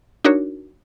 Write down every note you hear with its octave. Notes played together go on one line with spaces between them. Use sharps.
D4 D#4 F#4 A#4 C#5